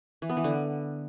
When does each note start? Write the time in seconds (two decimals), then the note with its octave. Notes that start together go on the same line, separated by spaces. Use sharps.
0.22 E3
0.29 B3
0.37 E3
0.44 D3